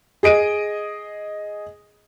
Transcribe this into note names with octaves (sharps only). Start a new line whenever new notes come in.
G#4 D#5 D7 D#7